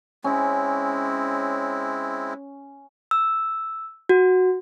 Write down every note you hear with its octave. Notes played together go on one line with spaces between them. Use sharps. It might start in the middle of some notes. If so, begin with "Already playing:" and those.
G#3 C4 C#4 E4
E6
F#4